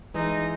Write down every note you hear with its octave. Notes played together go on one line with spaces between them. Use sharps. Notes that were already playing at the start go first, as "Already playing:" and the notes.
E3 G#3 D#4